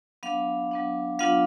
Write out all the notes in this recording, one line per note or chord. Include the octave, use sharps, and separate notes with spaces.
F#3 B3 D4 F5
F#3 B3 D4
F#3 B3 D4 F4 F5